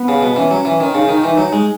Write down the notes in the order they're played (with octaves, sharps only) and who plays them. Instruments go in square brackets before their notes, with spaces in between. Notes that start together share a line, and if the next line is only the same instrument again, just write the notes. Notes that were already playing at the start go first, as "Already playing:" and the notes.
Already playing: [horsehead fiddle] B3
[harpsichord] C#3
B2
[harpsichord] E3 [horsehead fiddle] C#4
[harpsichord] F#3
E3
D#3
[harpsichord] C#3 [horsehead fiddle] D#4
[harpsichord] D#3
E3
F#3
G#3